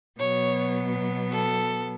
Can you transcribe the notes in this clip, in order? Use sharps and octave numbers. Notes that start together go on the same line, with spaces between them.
B2 F#3 B3 C#5
A4